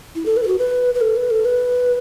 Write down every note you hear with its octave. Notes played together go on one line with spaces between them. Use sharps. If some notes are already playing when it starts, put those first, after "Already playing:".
E4
A4
B4
A4
F#4
B4
B4
A4
B4
A4
B4